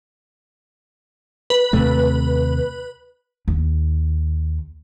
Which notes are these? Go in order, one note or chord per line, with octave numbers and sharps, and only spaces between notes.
B4
D#2 C3 A3
D#2